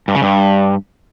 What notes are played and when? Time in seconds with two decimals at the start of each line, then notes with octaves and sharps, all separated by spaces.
0.08 G2
0.15 C#3
0.22 G2